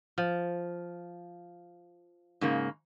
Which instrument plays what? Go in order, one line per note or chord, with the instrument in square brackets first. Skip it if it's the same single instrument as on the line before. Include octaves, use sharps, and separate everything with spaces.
[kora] F3
[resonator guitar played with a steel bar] G#2 C#3 A#3